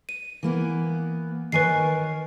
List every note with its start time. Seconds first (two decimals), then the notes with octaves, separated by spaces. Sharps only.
0.09 D#7
0.43 E3 A#3 B3
1.52 D#3 A#4 B4 C#5 G#5 C7